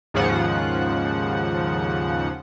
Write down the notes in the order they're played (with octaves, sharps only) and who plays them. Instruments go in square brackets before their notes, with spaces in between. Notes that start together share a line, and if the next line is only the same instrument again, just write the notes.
[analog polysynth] D#2 G#2 C#3 F3 F#5